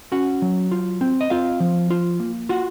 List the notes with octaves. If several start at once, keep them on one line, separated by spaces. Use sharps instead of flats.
C#4 F#4 F#5
F#3
F4
C4
D#5
C4 F4 F5
F3
F4
A#3
F4 F#4 F#5